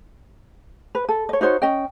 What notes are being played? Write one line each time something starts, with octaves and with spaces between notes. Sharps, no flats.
B4
A4
C#5 D#5
D#4 F#4 C5 C#5
C#4 D#5 G5